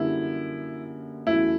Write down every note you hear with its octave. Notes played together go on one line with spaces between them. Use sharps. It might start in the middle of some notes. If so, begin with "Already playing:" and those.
Already playing: F#2 D3 G3 A#3 E4
E2 C#3 F#3 A3 E4